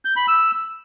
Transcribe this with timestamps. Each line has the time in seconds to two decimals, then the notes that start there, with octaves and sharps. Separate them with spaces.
0.05 G6
0.17 B5
0.28 E6